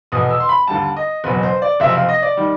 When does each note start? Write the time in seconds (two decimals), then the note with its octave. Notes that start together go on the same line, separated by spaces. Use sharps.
0.12 F1 E2 B2 D#6
0.31 E6
0.40 C6
0.49 B5
0.67 D#2 D3 G3 A5
0.97 D#5
1.24 F#1 E2 B2 F#3 B4
1.43 C5
1.62 D5
1.80 F#1 F2 C3 F3 E5
1.95 F5
2.09 D#5
2.22 D5
2.37 D#3 G3